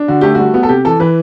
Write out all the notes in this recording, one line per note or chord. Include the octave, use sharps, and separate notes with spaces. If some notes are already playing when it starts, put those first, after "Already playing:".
Already playing: D4
D3 F#4
A3 G4
G3 F#4
B3
A4
C3 G4
E3 A4
E3 B4